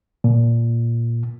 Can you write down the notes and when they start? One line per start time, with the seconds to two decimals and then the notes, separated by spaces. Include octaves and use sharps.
0.24 A#2